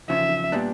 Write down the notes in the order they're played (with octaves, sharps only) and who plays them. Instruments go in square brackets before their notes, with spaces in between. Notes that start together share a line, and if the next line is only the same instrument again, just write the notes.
[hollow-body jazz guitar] E2 C#3 F3 [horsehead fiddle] E5
[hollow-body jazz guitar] A#2 G3 B3 D4